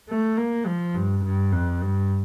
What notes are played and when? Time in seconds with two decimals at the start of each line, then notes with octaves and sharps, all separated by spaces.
0.09 A3
0.38 A#3
0.66 F3
0.95 G2
1.24 G2
1.52 F2
1.82 G2